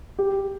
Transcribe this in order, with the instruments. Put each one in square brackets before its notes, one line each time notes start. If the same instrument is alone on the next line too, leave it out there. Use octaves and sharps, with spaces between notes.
[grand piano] G4